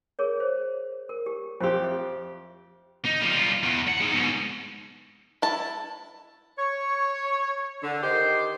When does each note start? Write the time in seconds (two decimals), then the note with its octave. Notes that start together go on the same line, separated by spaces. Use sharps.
0.19 G#4 A#4 C#5
0.40 C5
1.09 A#4
1.26 G4
1.61 F2 G4 C5 F5 C6
1.84 E5
3.06 D#4
3.23 G3 F4
3.64 E2
3.88 F#5
4.01 G#3 D#4
4.14 G#2 B2
5.42 E4 A5
6.58 C#5
7.83 D3
8.03 D#3 G4 C5